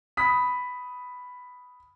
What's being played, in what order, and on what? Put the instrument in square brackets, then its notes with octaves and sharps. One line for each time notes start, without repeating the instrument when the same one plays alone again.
[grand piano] B5 D#6 B6